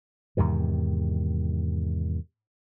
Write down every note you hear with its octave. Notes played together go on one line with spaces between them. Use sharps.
E2 G#2 C3 D#3